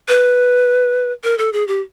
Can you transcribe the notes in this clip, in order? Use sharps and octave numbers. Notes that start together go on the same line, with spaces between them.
B4
A#4
A4
G#4
G4